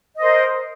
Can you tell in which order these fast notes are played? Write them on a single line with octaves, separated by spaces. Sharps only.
D#5 C5 A#4